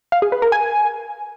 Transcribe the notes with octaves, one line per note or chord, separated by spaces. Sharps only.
F5
G#4
B4
A#4
G#5